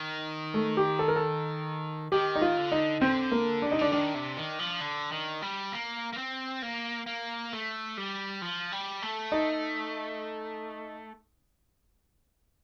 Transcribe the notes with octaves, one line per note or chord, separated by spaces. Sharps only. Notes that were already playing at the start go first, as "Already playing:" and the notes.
Already playing: D#3
A3
G4
A4
A#4
A4
D#3 G4
D#4
F4
D3
D#4
D3 C4
A#3
C3 D4
D#4
D3 D4
D#3 D4
C3
D#3
F3
D3
D#3
G3
A#3
A#3
C4
A#3
A#3
A3
G3
F3
G3
A3
D#4